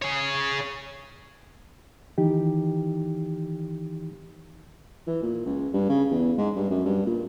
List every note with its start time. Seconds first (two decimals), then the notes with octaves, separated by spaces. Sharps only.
0.02 G#4 C#5
2.18 D#3 E3 D#4 G4
5.07 E3
5.23 A#2
5.46 C#2
5.73 G2
5.90 C#3
6.11 E2
6.38 G#2
6.56 G2
6.70 F#2
6.85 G2
7.06 A#2